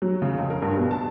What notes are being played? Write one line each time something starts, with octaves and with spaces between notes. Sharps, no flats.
F#3
C#3
F2
A#4
G2
B2
A5